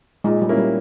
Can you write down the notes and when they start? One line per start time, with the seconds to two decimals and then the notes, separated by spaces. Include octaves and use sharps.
0.24 A#2 G#3
0.42 G3
0.49 A#3 C#4 E4
0.57 G3